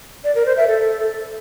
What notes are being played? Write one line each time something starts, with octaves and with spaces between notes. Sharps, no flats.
D5
A#4
C5
E5
A4